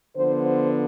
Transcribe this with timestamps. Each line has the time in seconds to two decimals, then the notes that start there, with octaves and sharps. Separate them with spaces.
0.15 D3 F3 B3 C5
0.44 C5